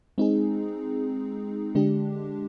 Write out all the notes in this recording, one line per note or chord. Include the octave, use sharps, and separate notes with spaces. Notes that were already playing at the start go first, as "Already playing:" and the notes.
G#3 C4 D#4 G#4
D3 G#3 D4 G4